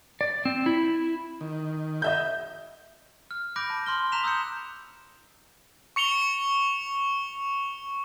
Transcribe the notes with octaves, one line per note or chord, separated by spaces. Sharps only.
D5
C4
E4
D#3
D#5 E5 G6
F6
B5 D6 F#6 G6 A#6 D7
A5
C6 F6 G7
A#5 F#6 B6 E7 F7
D#6 E6 F#6 G6 C#7
C#6 C#7 F7 G7